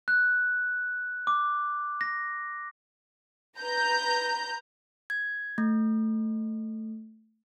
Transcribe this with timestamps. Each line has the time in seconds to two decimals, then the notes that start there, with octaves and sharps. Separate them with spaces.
0.08 F#6
1.27 D6
2.01 A#6
3.60 B4 A#5 G6
5.10 G#6
5.58 A3